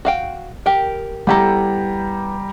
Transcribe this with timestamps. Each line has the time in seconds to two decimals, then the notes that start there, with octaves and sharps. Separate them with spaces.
0.05 F#4 F5 G5
0.66 G4 A#4 G5
1.27 G3 B3 E4 G4 A4 A#5